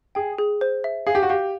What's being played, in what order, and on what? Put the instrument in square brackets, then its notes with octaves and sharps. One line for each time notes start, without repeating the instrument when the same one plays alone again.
[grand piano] G#4 [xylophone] G5
[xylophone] G#4
C5
E5
[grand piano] G#4 [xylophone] F5
[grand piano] G4
F#4
[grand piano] G4 [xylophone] F5